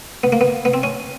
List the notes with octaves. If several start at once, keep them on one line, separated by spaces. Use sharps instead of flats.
B3
A#3
B3
B3
C4
C#4